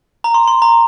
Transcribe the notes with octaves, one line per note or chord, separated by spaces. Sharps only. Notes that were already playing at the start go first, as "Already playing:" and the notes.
A#5
C6
C6
A#5